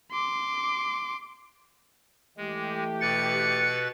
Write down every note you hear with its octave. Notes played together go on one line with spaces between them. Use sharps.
C6 D6
E3 G#3 A3 G4
B2 B4 A6 C#7